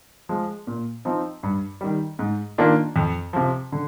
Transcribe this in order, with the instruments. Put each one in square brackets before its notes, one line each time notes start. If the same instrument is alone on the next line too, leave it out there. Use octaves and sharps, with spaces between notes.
[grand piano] F3 G#3
A#2
F3 C4 D#4
G2
D#3 G3
G#2
D#3 A#3 D4 F4
F2
C3 F3
D3